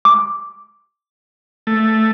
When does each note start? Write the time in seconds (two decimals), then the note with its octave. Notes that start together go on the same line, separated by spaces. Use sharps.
0.05 D6
1.67 A3